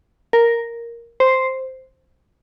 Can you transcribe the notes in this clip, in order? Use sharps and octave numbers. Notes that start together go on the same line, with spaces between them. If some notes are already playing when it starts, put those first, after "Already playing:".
A#4
C5